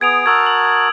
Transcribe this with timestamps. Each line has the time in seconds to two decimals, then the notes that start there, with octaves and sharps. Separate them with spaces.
0.01 B3 G#4 G#6 D7 F7
0.26 F#4 A#4 A5 D#6 E6 G#6
0.46 F#7